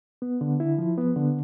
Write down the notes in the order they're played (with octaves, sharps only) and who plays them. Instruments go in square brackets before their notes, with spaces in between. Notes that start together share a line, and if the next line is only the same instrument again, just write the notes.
[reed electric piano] B3
D3
E4
F3
B3
D3